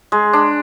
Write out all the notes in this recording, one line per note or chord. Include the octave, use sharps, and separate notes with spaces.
G#3
D4